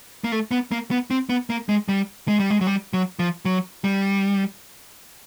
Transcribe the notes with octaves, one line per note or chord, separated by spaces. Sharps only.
A#3
A3
B3
A#3
B3
C4
B3
A#3
G#3
G3
G#3
G3
G#3
F#3
G3
F#3
F3
F#3
G3